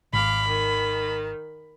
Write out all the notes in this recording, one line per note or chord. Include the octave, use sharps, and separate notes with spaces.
G#1 F5 B5 D6
D#3